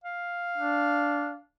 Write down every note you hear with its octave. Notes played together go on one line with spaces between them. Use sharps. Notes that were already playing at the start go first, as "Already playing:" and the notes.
F5
D4